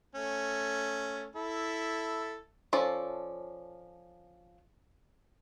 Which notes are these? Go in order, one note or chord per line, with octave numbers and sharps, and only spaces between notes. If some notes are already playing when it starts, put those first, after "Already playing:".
A3 C#4
E4 A4
F3 C#4 A4 D5